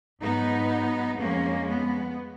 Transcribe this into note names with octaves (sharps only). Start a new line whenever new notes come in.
G#2 F#3 B3 D#4
F2 F3 G#3 A#3 C#4
B3